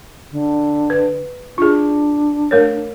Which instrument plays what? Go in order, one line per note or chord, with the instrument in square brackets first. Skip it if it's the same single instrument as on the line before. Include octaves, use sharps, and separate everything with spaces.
[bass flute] D3
[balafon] B4
[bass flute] D4 [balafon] F4 G#4
[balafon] A3 A#4 C#5